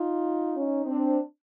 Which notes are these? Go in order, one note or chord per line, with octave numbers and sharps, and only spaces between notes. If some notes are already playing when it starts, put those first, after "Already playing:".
Already playing: D#4 F4
C#4 D#4
C4 D4